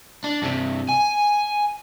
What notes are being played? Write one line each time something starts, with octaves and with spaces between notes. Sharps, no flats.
D4
G2 C3
G#5